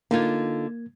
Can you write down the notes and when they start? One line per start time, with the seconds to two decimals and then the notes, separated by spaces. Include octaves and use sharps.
0.11 D3 A#3 D#4 F4 G#6